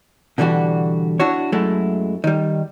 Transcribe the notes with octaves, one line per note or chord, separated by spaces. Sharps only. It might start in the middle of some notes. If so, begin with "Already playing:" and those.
B2 D3 E3 G3 F#4
D4 E4 F#4 C#5
F#2 F#3 G#3 A3 E4
D#3 G3